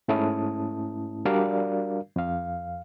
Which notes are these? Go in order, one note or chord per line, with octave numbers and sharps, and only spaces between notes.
G#2 A3 C#4 E4 A5 D#6
G3 D4 F#4 A#4 D5 F5
F2 F5